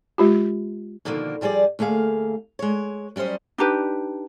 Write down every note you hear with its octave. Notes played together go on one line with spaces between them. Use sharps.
G#3 F4 G4
B2 D3 D#3 F3 A3 A#3
F3 G3 G#4 C5 D5
D2 A3 A#3 G#4 F5
G#3 C#5
F#3 G3 C#4 C5 D#5
D4 D#4 G4 B4